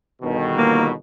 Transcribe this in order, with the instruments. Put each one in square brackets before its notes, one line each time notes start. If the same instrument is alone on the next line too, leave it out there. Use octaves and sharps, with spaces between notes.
[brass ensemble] G1 B2 D#3
[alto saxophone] A#3